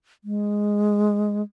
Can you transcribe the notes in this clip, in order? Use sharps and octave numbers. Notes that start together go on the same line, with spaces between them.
G#3